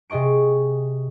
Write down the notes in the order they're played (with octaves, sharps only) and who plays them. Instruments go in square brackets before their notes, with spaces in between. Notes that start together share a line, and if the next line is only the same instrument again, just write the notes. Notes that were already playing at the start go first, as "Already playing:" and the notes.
[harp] C3 G#4 D#5 C#6 D7